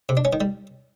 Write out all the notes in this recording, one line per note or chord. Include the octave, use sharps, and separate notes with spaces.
C3
D4
C#4
D#3
G3